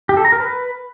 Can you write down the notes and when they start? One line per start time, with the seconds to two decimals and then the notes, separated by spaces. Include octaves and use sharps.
0.09 G4
0.17 A4
0.25 A#5
0.32 A#4
0.40 B4